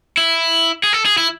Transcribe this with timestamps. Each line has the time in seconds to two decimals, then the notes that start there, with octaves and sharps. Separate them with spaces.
0.17 E4
0.84 G#4
0.93 A4
1.06 G#4
1.18 E4